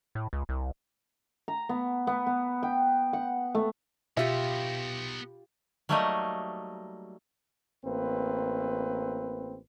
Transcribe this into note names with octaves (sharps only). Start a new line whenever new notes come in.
A2
C#2
C2
A#5
B3
B3
B3
G5
F#5
A3
B2 B3 D#4 F4 G4 B4 E5
F#3 G3 A3 A#3 D#4 D#5
A1 A#3 C4 B4